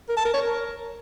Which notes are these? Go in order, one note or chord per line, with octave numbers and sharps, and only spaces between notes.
A#4
A5
A#4
C#5
A#4